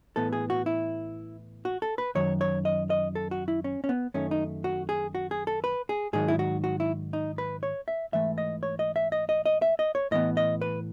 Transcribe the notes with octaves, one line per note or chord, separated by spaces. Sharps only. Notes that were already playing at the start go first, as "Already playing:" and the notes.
A2 E3 B3 A4
G#4
F#4
E4
F#4
A4
B4
F#2 D#3 F#3 C#5
C#5
D#5
D#5
A4
F#4
E4
C#4
C#4
B3
F#2 D#3 A3 C#4
D#4
F#4
G#4
F#4
G#4
A4
B4
G#4
G#2 D#3 F#3 G#4
E4
F#4
F#4
E4
D#4
B4
C#5
E5
G#2 E3 A3 E5
D#5
C#5
D#5
E5
D#5
D#5
D#5
E5
D#5
C#5
A2 E3 B3 D#5
D#5
B4